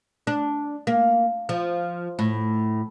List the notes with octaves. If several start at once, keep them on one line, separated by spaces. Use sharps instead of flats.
D4
A#3
F3
A2